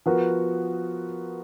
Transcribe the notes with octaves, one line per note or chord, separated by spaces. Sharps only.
F3 B3 F#4 A#4